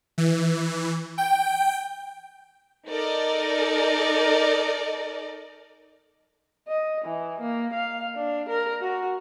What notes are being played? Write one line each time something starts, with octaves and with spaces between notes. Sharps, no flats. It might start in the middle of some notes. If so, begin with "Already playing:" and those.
E3
G5
D#4 A4 A#4 D5 D#5
D#5
E3
A#3
F5
D4
A#4
F#4